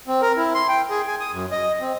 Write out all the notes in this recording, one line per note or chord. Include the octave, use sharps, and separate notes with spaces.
C4
A#4
E4
C6
G5
G#4
G#5
D#6
F#2
D#5
C4